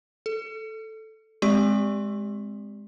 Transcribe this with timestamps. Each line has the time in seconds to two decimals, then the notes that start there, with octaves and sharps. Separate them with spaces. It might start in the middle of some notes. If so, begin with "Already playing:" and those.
0.26 A4
1.42 G#3 C4 G4 D5 C#6